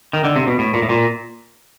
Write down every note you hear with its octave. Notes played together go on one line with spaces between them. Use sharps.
D#3
D3
C3
B2
A2
A#2
A2
A#2